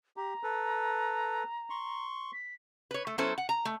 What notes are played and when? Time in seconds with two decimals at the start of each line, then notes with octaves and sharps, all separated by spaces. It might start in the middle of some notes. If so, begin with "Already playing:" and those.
0.17 G4 A#5
0.43 A4 B4
1.70 C6 C#6
2.33 B6
2.91 B4 C#5
3.07 A3
3.18 F#3 B3 C#4 E4 A4 C5
3.38 F#5
3.49 A#5
3.65 A3